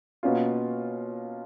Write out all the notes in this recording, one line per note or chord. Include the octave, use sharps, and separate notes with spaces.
B2 A#3 C#4 F4